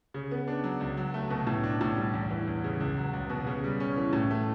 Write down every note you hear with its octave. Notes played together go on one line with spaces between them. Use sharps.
C#3
B3
D4
F#3
C#2
F#3
A3
B2
A2
D4
A2
G3
E2
E3
E2
C#3
C#2
F#3
C#2
B2
C#3
G3
C#4
E3
A2
A3